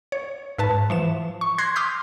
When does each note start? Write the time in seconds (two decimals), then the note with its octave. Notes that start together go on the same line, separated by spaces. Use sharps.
0.12 C#5
0.58 G#2 B4 A5
0.90 E3 F3 E7
1.41 C#6
1.58 C6 F#6 G#6 A#6 C7
1.76 C6 D6 D#6 F6 G6 B6